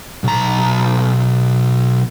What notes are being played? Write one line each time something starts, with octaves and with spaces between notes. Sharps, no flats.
B1 A#5